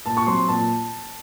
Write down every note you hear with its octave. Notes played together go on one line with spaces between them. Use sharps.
A#2 A5
C#6
F#3 C4 C6
A#2 A5